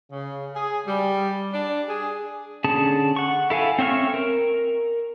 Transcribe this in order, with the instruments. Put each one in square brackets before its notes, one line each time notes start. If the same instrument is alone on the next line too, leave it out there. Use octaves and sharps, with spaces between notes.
[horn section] C#3
G#4
G3
D4
G#4
[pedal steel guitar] D3 C#4 G#4 A5
F#5 C#6
E4 A4 F5 G#5
C4 C#4 E5 C#6 F6
A#4